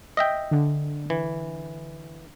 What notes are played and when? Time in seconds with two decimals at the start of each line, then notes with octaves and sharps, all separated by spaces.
0.17 D#5 E5 G5
0.51 D3
1.10 E3